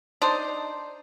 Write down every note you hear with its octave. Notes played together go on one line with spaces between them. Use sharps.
D4 D#4 C5